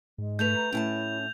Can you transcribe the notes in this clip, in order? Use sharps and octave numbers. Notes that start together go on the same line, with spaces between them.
G#2 G#3
A3 A4 B4 G6 F7
A#5
A2 C#4 E4 G#5 A5